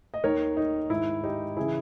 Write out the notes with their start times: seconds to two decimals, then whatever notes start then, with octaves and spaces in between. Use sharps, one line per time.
0.14 D#5
0.24 D#2 D#3 A#4 C#5
0.57 D#4
0.90 G#2 D#3 E4
1.23 D#4 G4
1.57 C#3 E3 E4 G#4